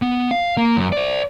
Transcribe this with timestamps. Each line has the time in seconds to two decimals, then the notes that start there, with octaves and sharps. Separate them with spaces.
0.02 B3
0.31 F5
0.57 A#3
0.77 F#2
0.92 C5 D5